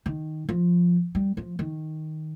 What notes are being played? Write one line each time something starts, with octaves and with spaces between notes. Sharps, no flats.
D#3
F3
G3
F3
D#3